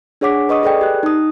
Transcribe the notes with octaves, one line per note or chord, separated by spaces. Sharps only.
D4 G#4 C#5 F#5 D6 B6
B4 D#5 C#6 D#6
G#4 A4 B4 D5 G5
G4 F#6
D#4 D#6